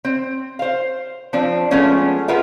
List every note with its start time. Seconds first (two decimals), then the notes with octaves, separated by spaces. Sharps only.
0.05 C4
0.59 C5 F5
1.33 F3 C4 D4
1.71 F3 G#3 A3 B3 C#4 D4
2.28 F4 G#4 A#4 B4 E5 F#5